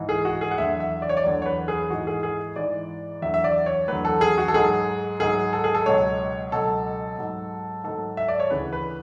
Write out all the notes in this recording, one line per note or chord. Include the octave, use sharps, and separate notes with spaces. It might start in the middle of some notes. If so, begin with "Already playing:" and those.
Already playing: G#2 E3
G#4
F#4
G#4
F#5
E2 D3 F#3 E5
E5
D5
C#5
D5
E2 D3 F#3 C#5
C#5
B4
G#4
G#2 E3 F#4
G#4
G#4
G#2 E3 D5
E2 D3 F#3 E5
E5
D5
C#5
E2 D3 F#3 B4
A4
G#4
F#4
A4
G#2 F#3 G#4
G#2 F#3 G#4
A4
G#4
A4
C#2 B2 F#3 C#5
C#2 B2 F#3 A4
G#2 F#3
G#2 F#3 A4
E5
D5
C#5
D2 C#3 E3 B4
B4